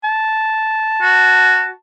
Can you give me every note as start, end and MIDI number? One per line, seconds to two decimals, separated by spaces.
0.04 1.75 81
1.02 1.70 66